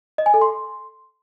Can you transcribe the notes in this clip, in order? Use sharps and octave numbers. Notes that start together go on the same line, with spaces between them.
D#5
G#5
A4
C6